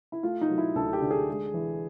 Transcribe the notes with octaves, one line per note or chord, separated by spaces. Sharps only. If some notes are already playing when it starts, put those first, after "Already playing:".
E4
A3 F4
D#4
F#3
E4
D2 A4
G4
D3
G#4
G#3
E3